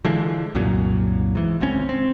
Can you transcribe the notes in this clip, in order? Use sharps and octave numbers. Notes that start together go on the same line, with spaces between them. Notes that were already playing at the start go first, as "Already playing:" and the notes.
D3 E3 F3 G#3
C2 F#2 A#2 F#3
G#2 E3
G#1 C#2 C4 C#4
C4